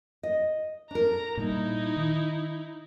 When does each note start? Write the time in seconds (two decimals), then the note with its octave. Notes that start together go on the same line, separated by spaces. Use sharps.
0.23 D#5
0.91 D4 A#4 A#5
1.37 A#2 G3 D#4 E4
1.97 D#3